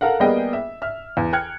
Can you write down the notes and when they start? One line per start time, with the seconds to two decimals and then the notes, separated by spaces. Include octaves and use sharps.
0.01 A4 A#4 F5 F#5
0.20 G3 A#3 B3 G#4 D#5 G5
0.53 E5
0.82 E5 F6
1.17 E2
1.33 G5 F6 F#6 G#6 C#7